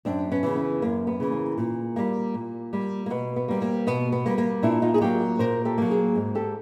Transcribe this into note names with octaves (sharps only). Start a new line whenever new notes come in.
F#2 C4 D4
B3 C#4
C#3 E3
B3
F#2 A#3
B3
C#3 E3
A#3
A#2
G3 A#3
A#2
G3 A#3
A#3
B2 B3
B3
G3 A#3
A#3 C4
B2 B3
B3
G3 A#3
A#3
A#2 D4 E4
D#4 F4
G#4
F#3 A#3 F4 G4
A#2 A#4 C5
G4 A4
F#3 A#3
G#4 A#4
G#2
G4 A4